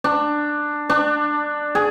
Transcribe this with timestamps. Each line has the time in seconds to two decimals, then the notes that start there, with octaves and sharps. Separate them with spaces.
0.04 D4
0.90 D4
1.75 G#4